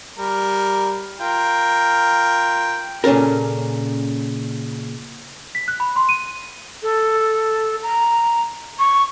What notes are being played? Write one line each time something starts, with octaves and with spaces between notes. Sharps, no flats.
G3 A#4
F4 A#4 G5
A#2 C#3 C#4 A4 A#4
B6
F#6
B5
C6
D#7
A4
A#5
C#6